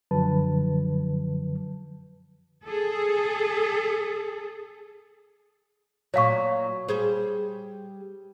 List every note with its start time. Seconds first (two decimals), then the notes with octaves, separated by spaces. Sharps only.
0.11 F#2 D3 F3 F#3 B4 A5
2.64 G#4 A4
6.14 A#2 F#3 C#5 F5 C#6
6.88 G3 G#4 C5